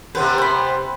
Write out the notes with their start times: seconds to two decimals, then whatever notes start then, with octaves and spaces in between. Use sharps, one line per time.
0.15 C3 B3 B4 C5
0.38 C5 B5